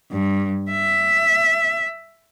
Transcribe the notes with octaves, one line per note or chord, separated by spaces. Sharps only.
G2
E5